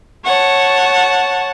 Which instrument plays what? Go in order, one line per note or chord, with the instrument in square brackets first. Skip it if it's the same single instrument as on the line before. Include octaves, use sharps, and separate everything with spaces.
[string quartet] C#5 F#5 A5